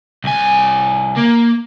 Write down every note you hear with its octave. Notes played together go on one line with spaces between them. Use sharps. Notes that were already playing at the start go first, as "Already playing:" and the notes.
C2 G#5
A#3